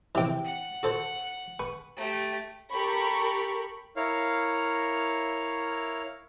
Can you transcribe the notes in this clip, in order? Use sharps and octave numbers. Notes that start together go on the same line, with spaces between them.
C3 E3 G4 G5
F#5
F#4 A4 C5
B4 C#6
A3 G4
G4 A4 A#4 B5 C#6
E4 A#4 C#5 F5